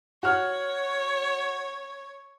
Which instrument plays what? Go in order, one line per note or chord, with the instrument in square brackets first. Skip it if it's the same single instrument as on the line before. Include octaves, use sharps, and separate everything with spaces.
[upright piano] F#4 F#5 F6 [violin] C#5